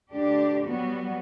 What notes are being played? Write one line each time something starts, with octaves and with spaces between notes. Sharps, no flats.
D2 D4 G4
F#3 G3 B3 F#4